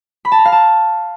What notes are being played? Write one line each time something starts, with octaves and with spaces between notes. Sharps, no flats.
B5
A5
A#5
F5
A5